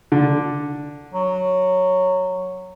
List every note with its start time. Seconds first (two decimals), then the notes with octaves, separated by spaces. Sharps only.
0.12 D3
1.13 F#3